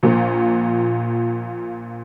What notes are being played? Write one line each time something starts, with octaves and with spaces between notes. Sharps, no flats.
A#1 A#2